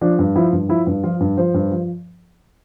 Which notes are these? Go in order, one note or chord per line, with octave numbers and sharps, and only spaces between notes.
F3 D4
G2
F3 E4
G2
F3 E4
G2
F3 F4
G2
F3 C5
G2
F3